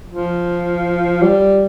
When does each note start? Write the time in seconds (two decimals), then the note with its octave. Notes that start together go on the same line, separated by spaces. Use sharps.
0.08 F3
1.22 G3